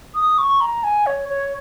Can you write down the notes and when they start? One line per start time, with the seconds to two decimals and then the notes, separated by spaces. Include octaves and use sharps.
0.15 D#6
0.38 C#6
0.61 A#5
0.84 G#5
1.06 C#5
1.29 C#5